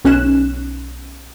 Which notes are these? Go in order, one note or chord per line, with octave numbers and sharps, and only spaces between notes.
B1 C#4 F#6 E7